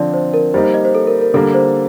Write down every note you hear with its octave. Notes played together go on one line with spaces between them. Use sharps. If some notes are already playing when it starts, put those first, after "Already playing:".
Already playing: D3 F3 C4 D5 A5
C5
A#4
G3 A#3 D#4 C5
C5
D#5
C5
A4
A#4
A#4
D3 G3 A#3 A4
C5